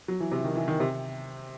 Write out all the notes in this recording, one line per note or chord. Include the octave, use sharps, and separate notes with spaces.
F#3
E3
C3
D#3
E3
D#3
C3